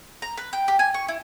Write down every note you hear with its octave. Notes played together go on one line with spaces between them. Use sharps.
A#5
B4
G5
G4
G#5
C#6
E4